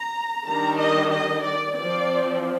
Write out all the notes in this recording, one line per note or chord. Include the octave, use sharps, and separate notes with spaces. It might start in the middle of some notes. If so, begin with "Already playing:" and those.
Already playing: A#5
D#3 G3 D4 A#5
D#5
D#5
D5
F3 C4 D5